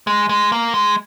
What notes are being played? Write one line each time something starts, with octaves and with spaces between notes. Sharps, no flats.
G#3
G#3
A#3
G#3